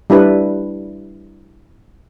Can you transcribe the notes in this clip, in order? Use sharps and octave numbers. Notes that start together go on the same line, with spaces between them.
G3 D4 E4 B4